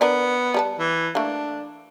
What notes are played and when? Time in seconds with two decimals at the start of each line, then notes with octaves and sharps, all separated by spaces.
0.01 B3 D4 A#4 D5
0.54 G3 A#4 A5
0.79 E3
1.15 A3 A#3 D4